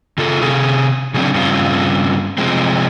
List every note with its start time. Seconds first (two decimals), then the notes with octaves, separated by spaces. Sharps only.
0.18 C#3 F4 A4
0.42 C3 G#4
1.14 C#3 F#3 C4 D4
1.34 G2 C#3 C4 F4
2.38 C3 F3 G#3 C4